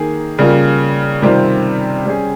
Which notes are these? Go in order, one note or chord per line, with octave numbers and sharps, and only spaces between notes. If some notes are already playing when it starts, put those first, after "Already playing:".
Already playing: D#3 A#3 G#4
C#3 G3 A#3 F4
C3 D#3 G3 C4 F4
G3 C#4 G#4